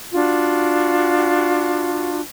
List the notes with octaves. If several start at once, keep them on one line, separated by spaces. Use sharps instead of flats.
D4 F4 F#4